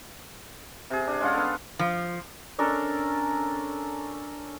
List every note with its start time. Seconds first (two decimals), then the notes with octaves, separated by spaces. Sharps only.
0.90 C3 G#4
1.07 D4
1.21 G#3 C#4 F4 F#5
1.33 B3 D4 A4
1.79 F3
2.58 C#4 D4 A4 A#4